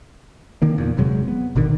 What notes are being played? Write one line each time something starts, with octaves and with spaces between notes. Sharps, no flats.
D3 D#3 A#3
E2 A#2
F1 C3 F#3 G#3
B3
G#1 B2 D3 D#3